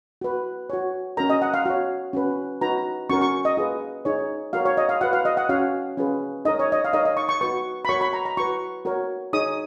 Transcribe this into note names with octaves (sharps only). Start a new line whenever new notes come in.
F#4 B4
F#4 C#5
C#4 F#4 A#4 A#5
D#5
F#5
F5
F#4 C#5
C#4 F#4 B4
D#4 F#4 B4 A#5
C#4 F#4 A#4 C#6
C#6
D#5
F4 G#4 B4
D#4 G#4 C#5
F#4 A#4 C#5 F5
C#5
D#5
F5
F#4 B4 F#5
F5
D#5
F#5
C#4 F#4 C#5 F5
C#4 F4 G#4 B4
D#4 A#4 C#5 D#5
C#5
D#5
F5
D#4 A#4 C#5 D#5
D#5
C#6
C#6
F#4 B4 C#6
B5
F#4 A#4 C#5 C#6
B5
A#5
A#5
F#4 B4 C#6
F#4 A#4 C#5
D#4 G#4 C#5 D#6